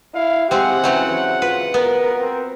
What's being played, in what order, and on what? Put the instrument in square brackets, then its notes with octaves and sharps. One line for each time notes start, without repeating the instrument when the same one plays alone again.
[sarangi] E4 [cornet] F5
[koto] G#3 C4 [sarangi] G4 [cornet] F#5
[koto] C#3 F#3 C4 [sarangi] E3
[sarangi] F4 [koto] B4
[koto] B3 [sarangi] A#4
[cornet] C4